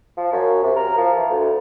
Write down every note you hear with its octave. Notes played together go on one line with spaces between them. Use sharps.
F3
F#2
C3
A#4
F3
E3
D2